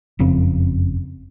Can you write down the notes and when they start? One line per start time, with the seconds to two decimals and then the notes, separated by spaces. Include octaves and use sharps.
0.19 F#1 F2 C#3 C4